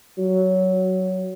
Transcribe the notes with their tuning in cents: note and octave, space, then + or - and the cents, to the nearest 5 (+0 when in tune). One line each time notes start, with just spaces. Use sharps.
F#3 +10